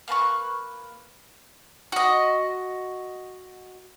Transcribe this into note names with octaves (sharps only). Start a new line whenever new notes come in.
A#3 B4 A5 C#6
F#4 D#5